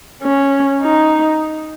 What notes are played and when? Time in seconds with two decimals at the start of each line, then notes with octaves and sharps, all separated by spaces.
0.22 C#4
0.82 D#4